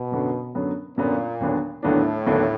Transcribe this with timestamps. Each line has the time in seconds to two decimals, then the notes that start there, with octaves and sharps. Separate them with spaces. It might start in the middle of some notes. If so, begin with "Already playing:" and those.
Already playing: B2
0.12 F#2 D3 F#3 B3
0.55 F#2 D3 F#3 B3
0.98 F#2 A#2 D3 F#3 B3
1.40 D#2 D3 F#3 B3 D4
1.83 D#2 A2 D3 F#3 B3 D4
2.26 D#2 D3 F#3 B3 D4